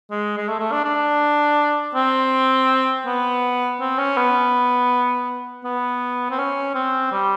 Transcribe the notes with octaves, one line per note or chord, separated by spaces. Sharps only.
G#3
G#3
A3
A3
D4
D4
C4
B3
C4
C#4
B3
B3
C4
C#4
C4
G3